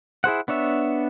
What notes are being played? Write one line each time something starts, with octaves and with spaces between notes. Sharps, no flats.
E4 G#4 C5 F#5
B3 D4 C#5 E5